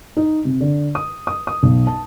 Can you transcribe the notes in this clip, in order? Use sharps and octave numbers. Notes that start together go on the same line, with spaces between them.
D#4
C3
D3
D#6
D#6
D#6
B1
A5